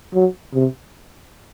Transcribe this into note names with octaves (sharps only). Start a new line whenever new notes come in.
F#3
C3